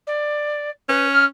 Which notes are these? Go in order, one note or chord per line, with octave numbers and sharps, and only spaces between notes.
D5
C#4 B4
F6